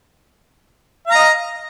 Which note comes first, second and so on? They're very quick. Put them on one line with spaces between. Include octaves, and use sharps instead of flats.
F5 A#5 D#5